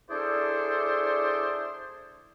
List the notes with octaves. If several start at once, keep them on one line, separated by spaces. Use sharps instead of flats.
D4 E4 G#4 A4 C5 D5